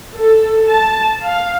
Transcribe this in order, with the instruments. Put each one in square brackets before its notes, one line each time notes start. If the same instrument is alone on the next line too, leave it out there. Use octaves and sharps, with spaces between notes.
[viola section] A4
A5
F5